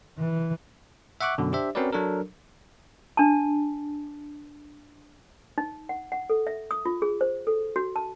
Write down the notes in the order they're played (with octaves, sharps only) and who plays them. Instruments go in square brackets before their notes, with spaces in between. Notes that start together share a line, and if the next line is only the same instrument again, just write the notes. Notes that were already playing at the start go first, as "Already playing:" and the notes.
[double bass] E3
[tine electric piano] E5 F#5 C#6 D6 F#6
F#2 B2 D3
D4 G4 C5 E5
C4 C#4 F#4 A#4 B4 D5
F#3 D4 A4 A#4
[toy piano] D4 A5
D#4
F#5
F#5
A4
E5
D#6
F4
G#4
C5
A4
F#4
A5